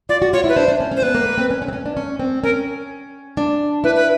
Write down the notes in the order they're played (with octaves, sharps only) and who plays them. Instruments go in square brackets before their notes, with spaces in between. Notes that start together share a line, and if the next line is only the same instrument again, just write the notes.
[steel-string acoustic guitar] F4 [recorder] D5
[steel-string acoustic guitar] F#4
[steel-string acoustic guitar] F4 [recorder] C#5
[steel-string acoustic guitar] E4 [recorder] B4
[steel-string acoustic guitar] D4 [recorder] C5
[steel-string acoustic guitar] D4
C#4
C#4
[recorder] C5
[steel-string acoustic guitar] B3 [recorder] B4
[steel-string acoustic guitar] A#3
A#3
C4
C#4
C#4
C4
C#4
D4
C#4
C4
[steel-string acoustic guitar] C#4 [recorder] A#4
[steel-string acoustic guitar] D4
[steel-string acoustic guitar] E4 [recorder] B4
[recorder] B4